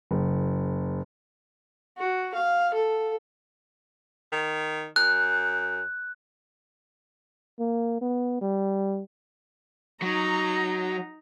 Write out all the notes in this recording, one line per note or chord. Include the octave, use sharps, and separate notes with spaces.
F#1
F#4
F5
A4
D#3
F#2 F#6
A#3
B3
G3
F#3 D#4 A#5